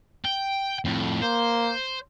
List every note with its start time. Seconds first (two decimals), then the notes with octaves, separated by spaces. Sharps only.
0.25 G5
0.85 F2 A2
1.22 A#3 C5